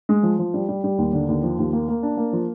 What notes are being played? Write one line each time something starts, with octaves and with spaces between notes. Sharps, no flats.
G#3
F3
F3
G3
G3
G3
D#2
D3
D#2
F3
D#2
A#3
A#3
D4
A#3
F3